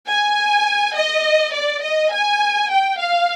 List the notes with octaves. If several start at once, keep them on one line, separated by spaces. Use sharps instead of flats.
G#5
D#5
D5
D#5
G#5
G5
F5